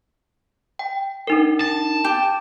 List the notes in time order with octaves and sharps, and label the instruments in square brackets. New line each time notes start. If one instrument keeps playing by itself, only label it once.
[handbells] G5
D4 D#4 A#4
[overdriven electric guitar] A5
[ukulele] G4